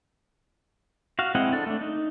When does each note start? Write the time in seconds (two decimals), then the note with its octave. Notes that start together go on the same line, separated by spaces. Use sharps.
1.19 F#4 F5
1.35 G#3 C4 E4 D#5 F#5
1.53 D4 A4
1.66 A3 D4
1.81 D#4